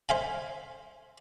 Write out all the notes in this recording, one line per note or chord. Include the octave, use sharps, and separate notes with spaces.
C5 E5 F5 G#5